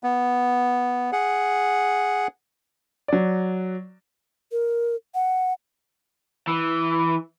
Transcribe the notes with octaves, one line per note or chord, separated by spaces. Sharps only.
B3
G#4 F#5
F#3 D5
A#4
F#5
E3